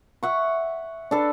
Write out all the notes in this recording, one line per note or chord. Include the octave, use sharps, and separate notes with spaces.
E5 F#5 C#6
D4 A4 B4